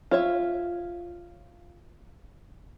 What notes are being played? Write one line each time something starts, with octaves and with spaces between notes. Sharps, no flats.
F4 C#5 E5